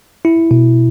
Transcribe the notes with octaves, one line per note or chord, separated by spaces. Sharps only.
E4
B2